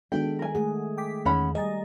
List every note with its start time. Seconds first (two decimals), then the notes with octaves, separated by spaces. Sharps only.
0.12 D#3 G#3 B3 D4 F#4 A4 G5
0.39 A#4 G#5
0.55 G#3 A3 G#4 F#5
0.98 G5 D6 B6
1.25 E2 D#3 C#4 F#5 B5
1.55 G3 G#4 D#5 G#5 A#5 A6